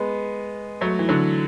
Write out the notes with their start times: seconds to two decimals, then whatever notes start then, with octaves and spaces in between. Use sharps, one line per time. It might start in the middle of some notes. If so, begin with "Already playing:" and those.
Already playing: G#3 B3
0.81 F#3 A3
0.99 E3
1.09 D3 F#3